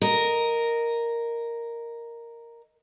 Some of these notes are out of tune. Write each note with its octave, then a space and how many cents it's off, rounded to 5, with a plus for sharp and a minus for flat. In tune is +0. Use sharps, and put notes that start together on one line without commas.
A#4 +0 D#5 +0